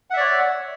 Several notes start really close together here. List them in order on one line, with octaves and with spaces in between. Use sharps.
F#5 E5 D5 C#5